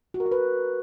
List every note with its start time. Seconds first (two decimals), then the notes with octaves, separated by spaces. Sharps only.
0.14 F#4
0.20 A#4
0.26 F#4
0.32 B4